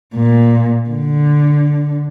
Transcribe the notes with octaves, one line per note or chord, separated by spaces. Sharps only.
A#2
D3